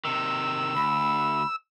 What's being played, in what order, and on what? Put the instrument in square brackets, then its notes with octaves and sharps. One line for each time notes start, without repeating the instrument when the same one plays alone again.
[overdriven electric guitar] C3 D#3 [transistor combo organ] E6
[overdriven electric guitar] D2 [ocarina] B5